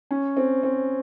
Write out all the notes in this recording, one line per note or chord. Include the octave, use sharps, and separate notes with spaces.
C#4
C4
C4